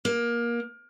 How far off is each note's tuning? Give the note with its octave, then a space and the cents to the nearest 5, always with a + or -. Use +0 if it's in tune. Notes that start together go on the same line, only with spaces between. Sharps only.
A#3 +20